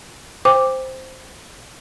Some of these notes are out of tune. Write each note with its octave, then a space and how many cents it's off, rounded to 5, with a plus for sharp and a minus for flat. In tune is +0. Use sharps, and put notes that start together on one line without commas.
C5 +0 G5 +30 D6 +0